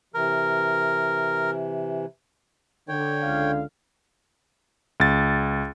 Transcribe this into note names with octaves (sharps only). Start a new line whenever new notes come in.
C3 E3 A#4
D3 C#5 G5
C#2 F5
C#2 A6